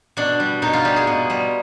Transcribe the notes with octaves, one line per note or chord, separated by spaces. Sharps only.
B2 D4
G3
B2 D#4
F4
G3 G4
G#4
B2
G3